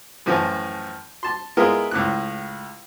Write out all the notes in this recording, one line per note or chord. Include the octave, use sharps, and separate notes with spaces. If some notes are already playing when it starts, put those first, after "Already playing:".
F#2 A2 E3 F3
A5 C6
G#3 B3 E4 F4 A#4
C#2 A2 F#6